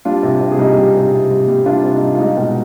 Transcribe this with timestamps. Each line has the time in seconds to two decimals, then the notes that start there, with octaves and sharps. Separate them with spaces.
0.05 G3 D4 F4
0.23 C3
0.41 C3
0.51 G#4
0.58 G3 D#4 G4
0.77 G3
0.95 C3
1.13 C3
1.31 G3
1.48 G3
1.66 C3 D4 F4
1.84 C3
1.93 D#4
2.02 G3
2.15 F4
2.19 G#3 D#4
2.37 B2